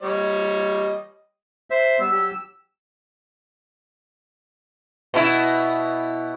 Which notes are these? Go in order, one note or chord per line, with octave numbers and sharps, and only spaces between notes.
G3 C#5 D#5
C5 E5
G3 B3 E6
F#3 G4
B2 E4